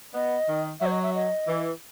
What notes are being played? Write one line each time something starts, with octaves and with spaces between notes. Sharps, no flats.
B3 D#5
D#3
F#3 E5
C5
D#5
E5
D#5
E3